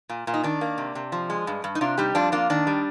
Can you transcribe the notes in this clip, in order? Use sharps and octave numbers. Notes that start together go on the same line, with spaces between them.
A#2
A#2
D#4
D#3 D4
A#3
C3
C3
F3
G#3
G2
G2
D#4
C3 D4 F4
G3 D#4 G4
F2 D4 F4
A#3 D4 F4
D#3 D4
G3